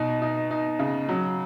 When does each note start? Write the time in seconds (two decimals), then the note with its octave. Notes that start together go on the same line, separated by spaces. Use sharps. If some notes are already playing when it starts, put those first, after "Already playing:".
Already playing: B2 D#4
0.22 D#4
0.51 D#4
0.79 C#3
1.09 F#3